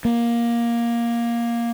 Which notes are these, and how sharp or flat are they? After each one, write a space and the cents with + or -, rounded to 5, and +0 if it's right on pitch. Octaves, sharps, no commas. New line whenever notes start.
A#3 +10